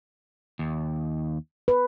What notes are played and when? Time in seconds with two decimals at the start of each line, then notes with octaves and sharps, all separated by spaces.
0.59 D#2
1.68 B4